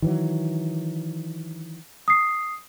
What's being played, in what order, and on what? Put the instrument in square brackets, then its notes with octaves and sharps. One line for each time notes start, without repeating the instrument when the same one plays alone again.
[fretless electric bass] D#3 E3 F#3
[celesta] D#6 C7